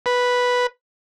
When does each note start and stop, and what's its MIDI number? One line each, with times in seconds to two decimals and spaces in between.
0.06 0.67 71